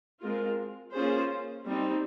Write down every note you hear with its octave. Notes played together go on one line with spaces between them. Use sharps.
G#3 C4 F4 A#4
A#3 C#4 F4 G#4 C5
G3 C4 D#4